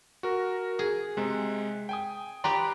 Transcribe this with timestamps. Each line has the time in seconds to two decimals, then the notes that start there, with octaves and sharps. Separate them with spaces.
0.23 F#4 A#4
0.79 G#4
1.17 C3 G#3
1.89 G5 G#5 D#6
2.44 G4 B4 D5 G5 A#5 C6